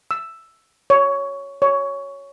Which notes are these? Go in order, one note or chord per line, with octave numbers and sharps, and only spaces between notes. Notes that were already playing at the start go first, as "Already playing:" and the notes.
E6
C#5
C#5